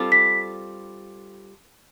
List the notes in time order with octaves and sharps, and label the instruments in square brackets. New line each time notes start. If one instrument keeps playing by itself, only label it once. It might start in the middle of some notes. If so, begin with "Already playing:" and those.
Already playing: [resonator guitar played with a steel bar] G3 C4 F4 A4
[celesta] B6